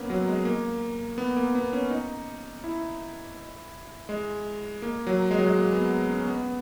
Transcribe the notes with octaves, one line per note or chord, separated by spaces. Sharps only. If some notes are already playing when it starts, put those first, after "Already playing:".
Already playing: A#3 B3 C#4
F#3
G#3
A#3
B3
A#3
B3
C#4
D#4
E4
G#3
A#3
F#3
G#3
F#3
G#3
A#3
B3
C#4
B3